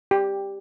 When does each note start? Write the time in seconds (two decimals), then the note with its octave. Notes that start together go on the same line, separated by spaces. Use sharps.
0.11 G4